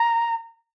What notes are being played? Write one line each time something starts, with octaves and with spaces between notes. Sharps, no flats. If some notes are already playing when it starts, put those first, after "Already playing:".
Already playing: A#5